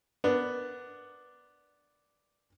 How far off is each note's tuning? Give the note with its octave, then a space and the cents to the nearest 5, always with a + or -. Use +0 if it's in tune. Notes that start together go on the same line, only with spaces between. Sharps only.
B3 +0 D4 +0 A#4 +5